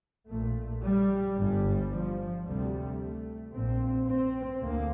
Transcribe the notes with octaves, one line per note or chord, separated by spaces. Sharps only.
A#1 A#2 A3
G3
G1 G2 G3
F3
D2 C3 G3
A3
A#1 A#2 C4
C4
D2 A#3